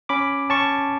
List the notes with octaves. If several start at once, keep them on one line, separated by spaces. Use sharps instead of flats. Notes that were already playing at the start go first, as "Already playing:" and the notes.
C#4 B5 D6
C#4 A5 C#6